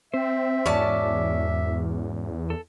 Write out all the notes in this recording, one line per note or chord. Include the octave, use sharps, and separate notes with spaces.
C4 C5 E5
E2 G#2 C#4 F#4 D5 A5
A4